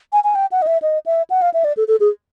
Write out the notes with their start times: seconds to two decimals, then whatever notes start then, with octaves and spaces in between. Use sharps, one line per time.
0.13 G#5
0.24 G#5
0.35 G5
0.52 F#5
0.62 D#5
0.67 E5
0.82 D#5
1.06 E5
1.30 F#5
1.42 F5
1.54 E5
1.64 D5
1.77 A4
1.88 A4
2.00 G#4